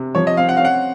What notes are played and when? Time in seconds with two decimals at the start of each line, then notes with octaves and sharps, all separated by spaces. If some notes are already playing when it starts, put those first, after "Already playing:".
Already playing: C3
0.15 F3 C#5
0.27 D#5
0.37 C4 F5
0.49 F#5
0.57 C#4 F5
0.65 F#5